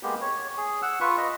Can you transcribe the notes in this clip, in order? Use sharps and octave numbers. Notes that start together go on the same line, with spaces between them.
G#3 A#3 B3 G4
C#5
G#4
F#5 E6
F4 B4 C#6
D#5